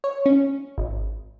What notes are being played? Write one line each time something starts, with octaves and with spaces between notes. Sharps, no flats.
C#5
C#4
G#1